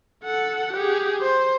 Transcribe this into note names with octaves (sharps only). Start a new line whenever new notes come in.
A4 F#5
G4 G#4
C5